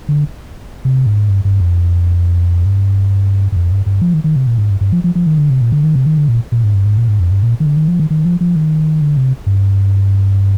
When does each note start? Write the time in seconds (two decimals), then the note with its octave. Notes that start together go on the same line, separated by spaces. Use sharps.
0.09 D3
0.85 C3
1.06 G#2
1.29 G2
1.45 G2
1.60 F2
2.66 G2
3.52 G2
3.56 F2
3.72 G2
3.86 G2
4.02 F3
4.14 D#3
4.24 D#3
4.36 C3
4.47 A#2
4.58 G#2
4.70 G2
4.81 G2
4.92 F3
5.04 F3
5.15 F3
5.27 D#3
5.38 D3
5.50 C3
5.61 A#2
5.72 D3
5.83 D#3
5.95 C3
6.06 D#3
6.18 D3
6.28 A#2
6.52 A#2
6.64 G#2
6.74 G2
6.85 G#2
6.98 A#2
7.08 G#2
7.20 F2
7.31 G2
7.43 A#2
7.60 D#3
7.66 D3
7.77 D#3
7.88 F3
7.99 D#3
8.10 D#3
8.25 F3
8.41 F3
8.56 D#3
9.01 D3
9.17 C3
9.47 G2